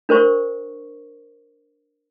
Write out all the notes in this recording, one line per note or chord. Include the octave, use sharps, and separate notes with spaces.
D4 A#4 C5 C#6